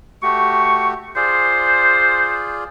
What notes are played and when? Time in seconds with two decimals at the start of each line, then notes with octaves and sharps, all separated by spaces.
0.23 A3 F#4 G4 C#6
1.16 F4 G#4 C5 D5